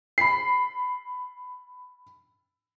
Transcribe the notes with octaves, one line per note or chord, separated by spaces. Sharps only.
B5 C7